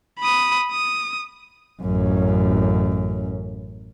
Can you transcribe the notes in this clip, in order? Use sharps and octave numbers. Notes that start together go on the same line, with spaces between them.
B5 D#6
D#6
A1 F#2